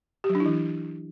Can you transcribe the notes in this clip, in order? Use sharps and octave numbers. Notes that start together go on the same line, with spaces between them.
G4
F#3
D4
E4
E3